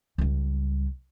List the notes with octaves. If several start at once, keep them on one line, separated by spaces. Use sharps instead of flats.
C#2 G3